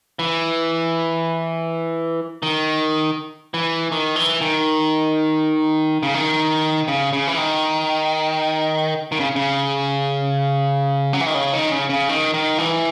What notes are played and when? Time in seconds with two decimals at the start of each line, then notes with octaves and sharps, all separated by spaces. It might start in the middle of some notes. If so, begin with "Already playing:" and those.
0.19 E3
2.43 D#3
3.54 E3
3.92 D#3
4.16 E3
4.41 D#3
6.03 C#3
6.14 D#3
6.88 C#3
7.13 C#3
7.28 E3
7.37 D#3
9.12 D#3
9.20 C#3
9.36 C#3
11.13 F#3
11.21 E3
11.27 D#3
11.34 C#3
11.53 D#3
11.71 C#3
11.89 C#3
12.09 D#3
12.34 D#3
12.58 E3